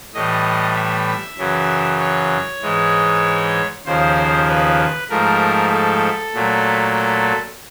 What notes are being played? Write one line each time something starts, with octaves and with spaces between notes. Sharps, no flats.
A2 E3 G3 D#5
E5
F#2 C#3 E3
C#5
G#2 E3 G#3
D#2 C#3 F3 C5
B4
G#2 F3 A3 A#4
A4
A#2 F#3 A3